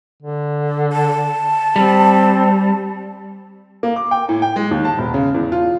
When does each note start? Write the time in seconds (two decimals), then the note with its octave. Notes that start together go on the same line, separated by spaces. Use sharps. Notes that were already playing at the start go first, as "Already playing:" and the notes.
0.23 D3
0.93 A5
1.76 G3 C4
3.83 A#3
3.96 D6
4.11 G5
4.29 A2
4.42 G5
4.56 G#3
4.71 D#2
4.85 A5
4.98 E1
5.14 C#3
5.35 E2
5.52 F4